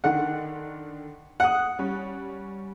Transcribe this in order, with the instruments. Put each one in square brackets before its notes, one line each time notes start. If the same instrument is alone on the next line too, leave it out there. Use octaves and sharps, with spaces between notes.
[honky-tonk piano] D3 D#3 D4 [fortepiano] F#5
[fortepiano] F#5 [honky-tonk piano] D#6 F#6
[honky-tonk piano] G3 C#4